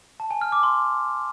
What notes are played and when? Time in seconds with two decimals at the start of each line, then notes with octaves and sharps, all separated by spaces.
0.20 A5
0.31 G#5
0.41 F6
0.52 D6
0.63 C6